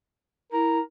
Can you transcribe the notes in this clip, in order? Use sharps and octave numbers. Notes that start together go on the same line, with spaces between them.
E4 A#4